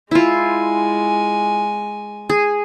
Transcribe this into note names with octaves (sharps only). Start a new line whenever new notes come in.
G#3 E4 F4 G#5
G#4